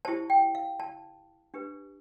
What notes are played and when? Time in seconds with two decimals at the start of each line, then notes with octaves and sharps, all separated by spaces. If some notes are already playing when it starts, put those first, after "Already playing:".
0.05 E4 G4 C5 A5
0.30 G5
0.55 F5
0.80 A5
1.54 D4 G4 B4